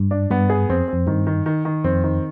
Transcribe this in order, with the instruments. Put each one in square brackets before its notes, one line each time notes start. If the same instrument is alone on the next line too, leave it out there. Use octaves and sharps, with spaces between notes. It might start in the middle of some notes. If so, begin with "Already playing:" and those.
Already playing: [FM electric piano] G2
[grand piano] D4
[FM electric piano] G2 [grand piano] B3
[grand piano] G#4
[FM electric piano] F2 [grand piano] C4
[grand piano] C4
[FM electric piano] F2
[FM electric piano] G2 [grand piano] D#3
[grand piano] D#3
D#3
D#3
[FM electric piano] F2 [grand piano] C4
[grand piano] D#3